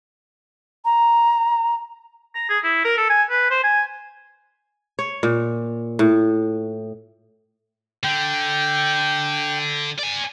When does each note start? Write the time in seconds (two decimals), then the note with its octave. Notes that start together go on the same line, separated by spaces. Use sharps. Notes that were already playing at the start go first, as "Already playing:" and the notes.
0.85 A#5
2.35 A#5
2.49 G#4
2.64 E4
2.85 A#4
2.97 A4
3.09 G#5
3.30 B4
3.50 C5
3.63 G#5
4.99 C#5
5.23 A#2
5.99 A2
8.04 D3 G5
9.99 D5 G#5